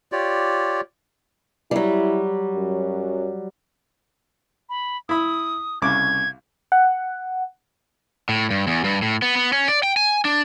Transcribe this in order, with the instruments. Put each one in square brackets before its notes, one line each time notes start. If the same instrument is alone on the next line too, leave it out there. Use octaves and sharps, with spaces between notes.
[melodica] F4 G4 C#5 D5
[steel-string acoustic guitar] F#3 G3 [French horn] E4
[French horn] F#2
[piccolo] B5
[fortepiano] E4 B5 [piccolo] D#6
[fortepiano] C2 C#3 D6 [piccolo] G#6
[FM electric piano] F#5
[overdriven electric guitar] A2
G2
E2
G2
A2
B3
B3
C#4
D5
G5
G#5
D4